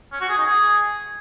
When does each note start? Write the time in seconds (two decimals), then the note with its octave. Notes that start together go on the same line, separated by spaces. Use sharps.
0.12 C#4
0.20 F#4
0.29 G#4
0.37 D#4
0.46 G#4